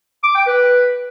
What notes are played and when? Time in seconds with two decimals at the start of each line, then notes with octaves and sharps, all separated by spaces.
0.23 D6
0.35 G5
0.46 B4